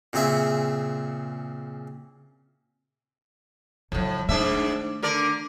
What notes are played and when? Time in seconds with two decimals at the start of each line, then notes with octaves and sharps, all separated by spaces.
0.13 A#2 C#3 C4 G#4 E5
3.92 F2 A2 C#3 F#3
4.29 G#2 D#3 A3 D4 E5
5.03 D3 A#4 D5